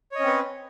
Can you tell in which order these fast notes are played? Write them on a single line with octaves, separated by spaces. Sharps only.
C#5 D#5 C#4 C4 B4